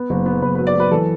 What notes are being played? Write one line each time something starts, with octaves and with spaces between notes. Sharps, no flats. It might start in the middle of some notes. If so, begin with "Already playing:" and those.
Already playing: B3
F#1
B3
F#1 B4
F#3 B4
D5
F#3 B4
E3 A4